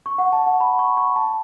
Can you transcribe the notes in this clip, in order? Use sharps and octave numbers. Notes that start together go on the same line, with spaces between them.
C#6
F#5
A5
F#5
B5
C#6
C#6
A5